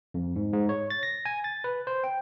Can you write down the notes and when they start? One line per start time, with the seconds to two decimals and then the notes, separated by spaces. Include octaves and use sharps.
0.14 F2
0.36 G#2
0.53 G#2
0.69 C#5
0.90 A6
1.03 A#6
1.26 G#5
1.44 A6
1.64 B4
1.87 C5
2.04 G5